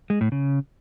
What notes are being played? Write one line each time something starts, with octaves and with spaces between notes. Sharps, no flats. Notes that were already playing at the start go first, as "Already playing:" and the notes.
G#3
A2
C#3